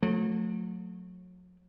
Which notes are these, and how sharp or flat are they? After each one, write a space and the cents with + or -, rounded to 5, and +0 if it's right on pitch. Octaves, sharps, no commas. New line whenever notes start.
F#3 -35 A3 +0